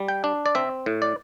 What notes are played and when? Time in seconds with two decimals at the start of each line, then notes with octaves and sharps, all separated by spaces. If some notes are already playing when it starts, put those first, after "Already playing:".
Already playing: G3
0.08 G5
0.24 D4
0.46 D5
0.55 C4 E5
0.86 A2
1.02 D5